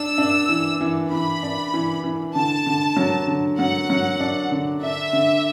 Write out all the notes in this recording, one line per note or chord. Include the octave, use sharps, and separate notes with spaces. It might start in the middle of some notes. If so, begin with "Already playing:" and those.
Already playing: D4 E6
D4
E3
E3
E3 B5
D4
E3
E3
D3 A5
D3
F#3
D3
F#3 F#5
F#3
D4
D3
D4 E5
D3